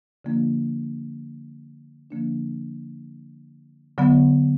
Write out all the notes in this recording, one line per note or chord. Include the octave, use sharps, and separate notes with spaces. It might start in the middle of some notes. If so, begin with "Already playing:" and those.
D3 F3 A#3 D4 F4
D3 F3 A#3 D4
D3 F#3 B3